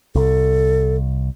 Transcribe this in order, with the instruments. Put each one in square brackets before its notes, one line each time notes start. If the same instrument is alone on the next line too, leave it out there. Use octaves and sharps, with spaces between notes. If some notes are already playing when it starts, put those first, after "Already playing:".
[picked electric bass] C2 [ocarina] A4